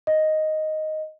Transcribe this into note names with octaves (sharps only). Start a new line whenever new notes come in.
D#5